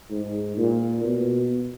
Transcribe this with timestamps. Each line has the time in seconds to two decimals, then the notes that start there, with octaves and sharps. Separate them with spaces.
0.10 G#2
0.57 A#2
1.04 B2